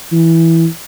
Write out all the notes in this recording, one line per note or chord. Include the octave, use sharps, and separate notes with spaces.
E3